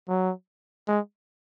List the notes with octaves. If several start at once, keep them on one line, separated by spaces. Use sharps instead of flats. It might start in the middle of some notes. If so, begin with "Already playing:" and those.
F#3
G#3